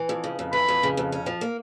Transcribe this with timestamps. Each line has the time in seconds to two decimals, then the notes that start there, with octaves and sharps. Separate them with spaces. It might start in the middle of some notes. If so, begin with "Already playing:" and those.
Already playing: E3
0.09 F2
0.24 C#3
0.39 F2
0.53 E3 B5
0.68 F2
0.83 C#3
0.97 F2
1.12 C#4
1.26 F3
1.41 A#3